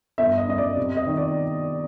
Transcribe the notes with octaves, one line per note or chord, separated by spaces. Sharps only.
G1 E5
D#5
F#2 D#5
D5
C3
D#5
D#3
D5